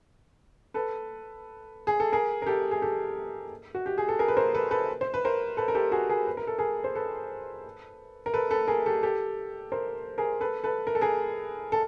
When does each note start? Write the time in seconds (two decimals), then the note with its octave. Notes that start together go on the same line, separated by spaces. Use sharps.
0.74 A4 B4
1.87 G#4
2.00 A4
2.13 G#4 A#4
2.42 A#4
2.46 G4 A4
2.71 G#4
2.82 G4 A4
3.75 F#4
3.86 G4
3.98 G#4
4.08 A4
4.19 G#4 A#4
4.28 B4
4.37 A#4 C5
4.54 A4 B4
4.71 A4 B4
5.01 C5
5.14 B4
5.25 A#4 C5
5.57 A4 B4
5.68 A#4
5.75 G4 A4
5.92 F#4 G#4
6.10 G#4 A#4
6.27 B4
6.37 A#4
6.47 A4
6.58 G#4 A#4
6.84 C5
6.95 A4 B4
8.26 A#4
8.34 A4 B4
8.50 A4 B4
8.68 G#4 A#4
8.86 G4 A4
9.03 G4 A4
9.72 A#4 C5
10.18 G#4 A#4
10.41 A4 B4
10.64 A4 B4
10.87 A#4
10.95 A4
11.01 G#4 A#4
11.72 A4